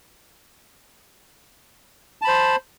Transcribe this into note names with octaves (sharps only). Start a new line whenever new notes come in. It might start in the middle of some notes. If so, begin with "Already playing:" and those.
C5 A5 B5